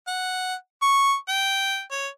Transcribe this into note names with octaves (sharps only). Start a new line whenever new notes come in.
F#5
C#6
G5
C#5